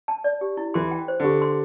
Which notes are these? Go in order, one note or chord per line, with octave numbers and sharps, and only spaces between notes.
A5
D5
G4
E4
E3 C6
G5
C5
D3 G4
C6